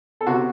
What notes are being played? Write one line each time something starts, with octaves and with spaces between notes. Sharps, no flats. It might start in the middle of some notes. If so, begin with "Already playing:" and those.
A4
C3 F#4